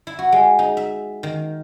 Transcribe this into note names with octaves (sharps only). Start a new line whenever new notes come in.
E4
F#4
G#3
D#4
E5
D#3